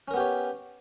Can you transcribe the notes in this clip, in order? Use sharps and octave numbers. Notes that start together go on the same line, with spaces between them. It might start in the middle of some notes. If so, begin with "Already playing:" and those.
B3 C#4 G4 A#4 C#5